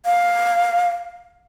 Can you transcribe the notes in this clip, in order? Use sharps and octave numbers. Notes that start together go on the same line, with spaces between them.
F5